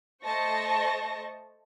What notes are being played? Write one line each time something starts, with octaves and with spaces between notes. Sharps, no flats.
A3 C5 D#5 A5 C#6 A#6